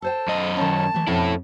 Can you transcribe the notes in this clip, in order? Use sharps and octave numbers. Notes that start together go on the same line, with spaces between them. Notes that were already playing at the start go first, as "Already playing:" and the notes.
A4 C5 G5 A5
F#2 D#5
D#3 C#4 A5
E3 G#3 A3
F2 B2 C#4 E4 A4